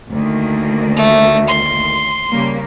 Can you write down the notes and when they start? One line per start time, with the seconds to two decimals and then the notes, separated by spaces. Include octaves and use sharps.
0.11 D2 D#3 A#3
0.96 A3
1.47 C6
2.31 C#3 G3 A#3